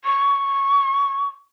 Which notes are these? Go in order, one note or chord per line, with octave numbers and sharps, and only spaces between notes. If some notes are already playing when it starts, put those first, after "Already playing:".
C#6